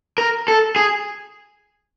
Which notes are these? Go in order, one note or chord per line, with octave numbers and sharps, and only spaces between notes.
A#4
A4
G#4